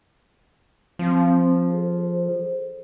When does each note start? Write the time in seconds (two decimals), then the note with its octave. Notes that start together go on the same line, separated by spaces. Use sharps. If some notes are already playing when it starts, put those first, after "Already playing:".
0.99 F3 C4
1.69 G#4 A4 C5